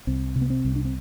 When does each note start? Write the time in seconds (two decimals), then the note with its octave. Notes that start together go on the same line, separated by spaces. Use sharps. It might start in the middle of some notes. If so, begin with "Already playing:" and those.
0.07 C2 C4
0.36 C3
0.41 B3
0.50 C4
0.65 C2
0.76 D4
0.85 C4